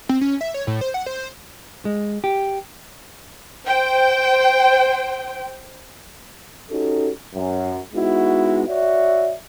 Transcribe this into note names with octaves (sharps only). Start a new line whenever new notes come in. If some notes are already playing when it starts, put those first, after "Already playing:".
C4
C#4
E5
C#5
A2
C5
F#5
C5
G#3
G4
C5 G5
C#4 D#4 F#4 G4 A4
F#2
G#3 B3 D#4 E4 F#4
F#4 C#5 D5 E5